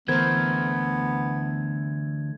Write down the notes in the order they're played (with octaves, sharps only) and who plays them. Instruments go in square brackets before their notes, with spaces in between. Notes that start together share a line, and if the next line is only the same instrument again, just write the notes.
[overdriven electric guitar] D3 A3 [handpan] E3 A#4 C5 [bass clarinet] B3 [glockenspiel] G#6